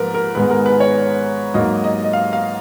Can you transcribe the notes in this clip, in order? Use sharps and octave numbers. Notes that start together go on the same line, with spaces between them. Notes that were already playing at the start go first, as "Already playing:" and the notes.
Already playing: G#2 F3 A#3 A#4 B4
A#4
G#2 D#3 G#3 B3 B4
A#4
B4
C#5
G#2 F#3 A#3 D#5
D#5
D#5
F5
F5